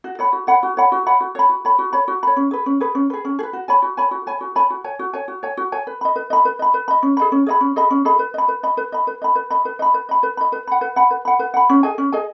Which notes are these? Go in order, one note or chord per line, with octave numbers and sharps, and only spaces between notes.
F#4
C#5 F#5 B5
F#4
C#5 F#5 B5
F#4
C#5 F#5 B5
F#4
C#5 F#5 B5
F#4
C#5 B5
F#4
C#5 B5
F#4
C#5 B5
F#4
C#5 B5
C#4
G#4 B4
C#4
G#4 B4
C#4
G#4 B4
C#4
G#4
B4
F#4
C#5 G#5 B5
F#4
C#5 G#5 B5
F#4
C#5 G#5 B5
F#4
C#5 G#5 B5
F#4
C#5 G#5
F#4
C#5 G#5
F#4
C#5 G#5
F#4
C#5 G#5
B4
D#5 B5
B4
D#5 B5
B4
D#5 B5
B4
D#5 B5
C#4
G#4 D#5 B5
C#4
G#4 D#5 B5
C#4
G#4 D#5 B5
C#4
G#4 D#5 B5
B4
D#5 B5
B4
D#5 B5
B4
D#5 B5
B4
D#5 B5
B4
D#5 B5
B4
D#5 B5
B4
D#5 B5
B4
D#5 B5
B4
F#5 B5
B4
F#5 B5
B4
F#5 B5
B4
F#5 B5
C#4
G#4 D#5 G#5
C#4
G#4 D#5 G#5